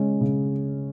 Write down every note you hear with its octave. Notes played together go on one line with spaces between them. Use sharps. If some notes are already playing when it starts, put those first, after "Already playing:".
Already playing: C#3 G#3 C#4
C#3